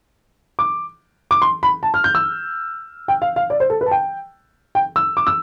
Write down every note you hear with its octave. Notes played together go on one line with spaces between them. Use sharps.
D6
D6
C6
B5
A5
F6
G6
E6
G5
F5
F5
D5
C5
A4
B4
A5
G5
G5
E6
D6
E6